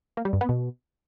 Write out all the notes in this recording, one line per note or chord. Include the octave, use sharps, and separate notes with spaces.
A#3
G3
G2
B3
B2